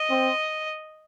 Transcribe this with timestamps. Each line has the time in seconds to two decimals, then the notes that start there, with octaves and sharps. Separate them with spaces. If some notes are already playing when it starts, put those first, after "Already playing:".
Already playing: D#5
0.10 C4